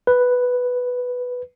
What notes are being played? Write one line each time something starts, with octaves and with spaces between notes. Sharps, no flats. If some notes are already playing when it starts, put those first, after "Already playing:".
B4